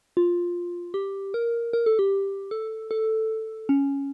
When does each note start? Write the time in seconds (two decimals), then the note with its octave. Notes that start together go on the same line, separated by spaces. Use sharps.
0.17 F4
0.94 G4
1.34 A#4
1.73 A#4
1.86 A4
1.99 G4
2.51 A4
2.91 A4
3.69 C#4